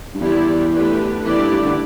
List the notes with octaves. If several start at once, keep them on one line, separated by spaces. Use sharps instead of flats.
G2
E2 G3 E4 G4 B4 D5
D3 A3 D4 G4 B4
E2 A3 E4 G4 B4 D5
G2
G2
D3